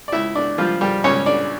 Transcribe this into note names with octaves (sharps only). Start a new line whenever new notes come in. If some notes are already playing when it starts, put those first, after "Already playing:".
D5
C#2 E4 E5
D4 D5
F3 G3 F4
G3 G4
C#2 C#4 C#5
D4 D5